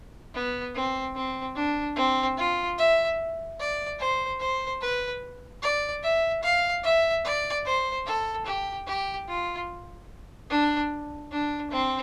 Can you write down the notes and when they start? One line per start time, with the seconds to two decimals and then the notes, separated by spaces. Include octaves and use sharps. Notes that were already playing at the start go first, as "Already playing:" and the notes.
0.34 B3
0.75 C4
1.15 C4
1.55 D4
1.96 C4
2.38 F4
2.78 E5
3.59 D5
4.00 C5
4.40 C5
4.81 B4
5.63 D5
6.03 E5
6.43 F5
6.84 E5
7.25 D5
7.66 C5
8.06 A4
8.46 G4
8.87 G4
9.29 F4
10.50 D4
11.32 D4
11.71 C4